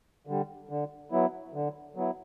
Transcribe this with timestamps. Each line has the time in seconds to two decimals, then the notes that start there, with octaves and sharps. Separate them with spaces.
0.27 D3 G3
0.69 D3
1.12 F#3 B3 E4
1.54 D3
1.96 F#3 B3 E4